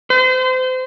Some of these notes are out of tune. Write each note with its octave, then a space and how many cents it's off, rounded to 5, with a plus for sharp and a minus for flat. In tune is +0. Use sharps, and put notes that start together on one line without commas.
C5 -30